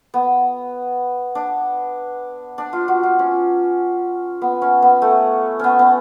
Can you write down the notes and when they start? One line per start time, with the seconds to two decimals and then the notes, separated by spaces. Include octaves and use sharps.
0.14 B3
1.35 D4
2.58 D4
2.73 F4
2.88 F#4
3.03 F4
3.19 C#4
4.42 B3
4.62 C#4
4.82 B3
5.02 A3
5.59 B3 C#4
5.79 B3